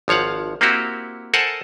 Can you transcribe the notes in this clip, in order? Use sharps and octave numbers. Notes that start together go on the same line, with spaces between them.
G#1 F3 C#5 F5 F#5
A#3 C4 E4 F#4 G4
A4 A#4 C5 F#5 G#5 A5